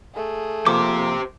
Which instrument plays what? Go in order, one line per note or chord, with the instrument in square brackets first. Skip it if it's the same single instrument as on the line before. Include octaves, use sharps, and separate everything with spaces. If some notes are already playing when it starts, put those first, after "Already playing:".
[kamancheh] A3 G#4
[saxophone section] F3 A#3 [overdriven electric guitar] G4 C5 [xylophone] D6